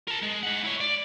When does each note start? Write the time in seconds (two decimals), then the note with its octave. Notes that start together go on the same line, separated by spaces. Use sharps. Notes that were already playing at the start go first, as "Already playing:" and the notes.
0.08 A#4 A5
0.22 G#3
0.43 G#3 F#5
0.64 E4 C#5
0.80 D5